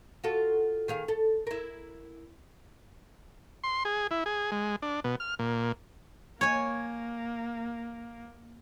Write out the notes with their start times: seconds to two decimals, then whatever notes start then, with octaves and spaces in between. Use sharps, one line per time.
0.24 F4 F#4 A4
0.88 D#3 G#4 F5
1.08 A4
1.47 E4 A#4
3.64 C6
3.85 G#4
4.11 E4
4.26 G#4
4.52 G#3
4.82 D4
5.04 B2
5.20 F6
5.39 A#2
6.41 A#3 C#5 G#5